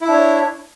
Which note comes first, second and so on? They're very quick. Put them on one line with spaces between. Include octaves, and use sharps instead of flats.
E4 E5 D4 C#5